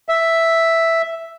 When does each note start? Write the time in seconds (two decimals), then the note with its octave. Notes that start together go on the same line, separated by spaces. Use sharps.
0.09 E5